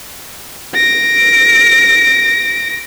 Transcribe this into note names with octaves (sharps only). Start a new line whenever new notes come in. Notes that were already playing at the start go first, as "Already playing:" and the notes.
A#6 D7